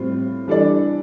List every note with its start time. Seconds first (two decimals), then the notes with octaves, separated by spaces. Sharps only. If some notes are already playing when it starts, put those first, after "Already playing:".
Already playing: A2 G3 C4 F4
0.48 E3 G3 D4 A4 D5